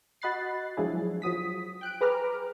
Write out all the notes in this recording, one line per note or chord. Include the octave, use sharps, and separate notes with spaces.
F#4 D#5 B5 F#6 A6 C7
F3 F#3 G#3 D4 E4 G#4
F3 F#3 D#6 B6
G5 F#6 D7
G#4 B4 A#5 D6 F6